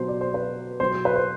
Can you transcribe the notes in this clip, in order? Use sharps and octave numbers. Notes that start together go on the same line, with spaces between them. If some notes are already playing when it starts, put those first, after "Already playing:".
Already playing: B2 F#3 C5
D5
C5
B4
B2 F#3 C5
B4
C5